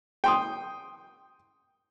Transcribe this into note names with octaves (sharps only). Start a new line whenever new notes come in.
G5 C6 D#6